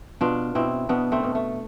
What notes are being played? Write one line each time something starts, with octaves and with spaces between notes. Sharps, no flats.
B2 D4 F4
B2 C4 E4
B2 B3 D4
A3 C4
B2
A3